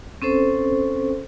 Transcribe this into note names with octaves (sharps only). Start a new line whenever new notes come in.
C4 C#4 A4 C5